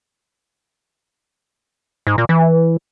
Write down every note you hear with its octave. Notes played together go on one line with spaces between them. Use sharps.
G#2
A#2
E3